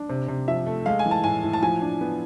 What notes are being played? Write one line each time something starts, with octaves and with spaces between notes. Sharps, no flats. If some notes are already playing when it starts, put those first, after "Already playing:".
Already playing: D4
C3
C3
F3 E5
A3
G#3 F5
G#5
E3
A5
A2 G#5
A2
A5
F3 G#5
D4
B3